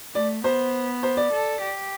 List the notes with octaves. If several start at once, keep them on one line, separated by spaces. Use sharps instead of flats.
A3 D5
B3 C5
C5
D5
A4
G4